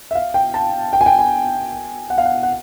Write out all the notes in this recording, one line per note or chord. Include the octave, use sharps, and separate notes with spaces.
E5
F5
G5
A5
G5
G#5
G5
G#5
F#5
F5
F#5
F#5